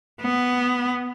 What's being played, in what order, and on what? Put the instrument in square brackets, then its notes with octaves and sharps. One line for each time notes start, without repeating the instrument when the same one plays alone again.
[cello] B3